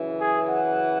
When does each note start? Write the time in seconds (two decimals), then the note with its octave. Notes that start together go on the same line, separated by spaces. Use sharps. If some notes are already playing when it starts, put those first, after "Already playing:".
Already playing: F#2 C#3 E3
0.20 G#4
0.48 F#5